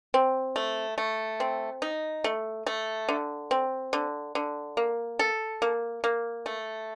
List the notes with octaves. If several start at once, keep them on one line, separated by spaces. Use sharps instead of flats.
C4
A3
A3
C4
D#4
A3
A3
D3
C4
D3
D3
A#3
A4
A#3
A#3
A3